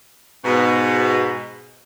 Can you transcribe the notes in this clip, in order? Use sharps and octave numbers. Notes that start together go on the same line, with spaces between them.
G#2 B2